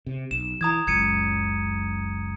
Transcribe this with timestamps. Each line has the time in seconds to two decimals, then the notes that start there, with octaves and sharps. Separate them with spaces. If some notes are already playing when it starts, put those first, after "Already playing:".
0.06 C3
0.31 B1 E7
0.61 E3 A#5 D#6 G#6
0.87 F#1 C#2 F#2 G#6 C#7 D#7